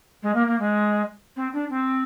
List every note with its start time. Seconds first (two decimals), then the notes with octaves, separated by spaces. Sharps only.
0.23 G#3
0.35 A#3
0.47 A#3
0.59 G#3
1.36 C4
1.53 D4
1.70 C4